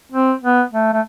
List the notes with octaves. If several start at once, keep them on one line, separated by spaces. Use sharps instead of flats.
C4
B3
A3
A3